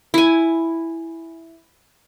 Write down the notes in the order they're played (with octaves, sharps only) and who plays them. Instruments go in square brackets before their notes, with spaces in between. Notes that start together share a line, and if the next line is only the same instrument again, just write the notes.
[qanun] E4 G#5